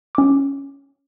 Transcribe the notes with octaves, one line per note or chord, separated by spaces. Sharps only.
C#4 D6